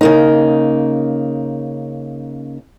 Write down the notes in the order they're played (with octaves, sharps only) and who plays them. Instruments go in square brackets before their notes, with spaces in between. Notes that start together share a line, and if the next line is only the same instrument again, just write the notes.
[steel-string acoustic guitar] C#3 A#3 D#4